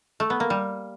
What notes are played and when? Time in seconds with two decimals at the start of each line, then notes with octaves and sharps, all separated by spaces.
0.20 A3
0.30 B3
0.40 A#3
0.50 G3